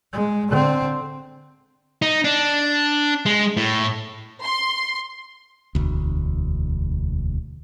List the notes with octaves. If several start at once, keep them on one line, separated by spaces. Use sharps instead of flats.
G#3
D3 C4
D#4
D4
G#3
A2
C6
E1 D2